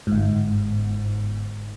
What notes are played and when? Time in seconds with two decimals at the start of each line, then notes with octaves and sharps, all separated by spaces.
0.07 G1 G#2